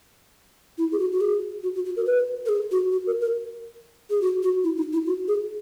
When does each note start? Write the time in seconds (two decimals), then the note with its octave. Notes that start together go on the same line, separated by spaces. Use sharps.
0.78 E4
0.92 G#4
0.99 F#4
1.12 F#4
1.21 G#4
1.63 F#4
1.75 F#4
1.85 F#4
1.96 A#4
2.06 B4
2.46 A#4
2.49 G#4
2.71 F#4
2.92 F#4
3.07 A#4
3.21 A#4
4.10 G#4
4.21 F#4
4.43 F#4
4.64 E4
4.77 D#4
4.93 E4
5.06 F#4
5.28 G#4